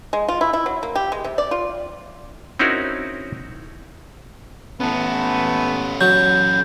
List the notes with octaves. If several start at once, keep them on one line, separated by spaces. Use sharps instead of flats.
G#3
F4
E4
E4
F#3
A#3
G4
G#3
C3
D5
F4
C4 C#4 D#4 E4 F#4 A#4
E3 A3 B3 C#4 A4
F#3 G6